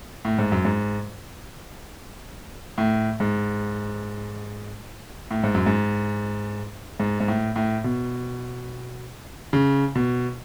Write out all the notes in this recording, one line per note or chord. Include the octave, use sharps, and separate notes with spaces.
A2
G#2
F#2
G#2
A2
G#2
A2
G#2
F#2
G#2
G#2
G#2
A2
A2
B2
C#3
B2